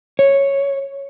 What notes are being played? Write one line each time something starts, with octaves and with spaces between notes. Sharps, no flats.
C#5